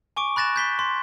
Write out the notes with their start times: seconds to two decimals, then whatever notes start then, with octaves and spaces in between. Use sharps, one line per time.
0.16 G#5 C#6 D6 D7
0.36 B5 F#6 A6 A#6 E7
0.56 G6 B6 G7
0.79 C6